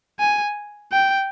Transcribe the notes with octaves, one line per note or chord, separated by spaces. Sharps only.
G#5
G5